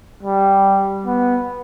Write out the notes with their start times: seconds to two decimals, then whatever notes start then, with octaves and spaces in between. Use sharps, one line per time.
0.23 G3
1.06 B3